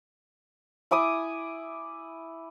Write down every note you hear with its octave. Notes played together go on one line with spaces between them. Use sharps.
E4 G#5 D6 D#6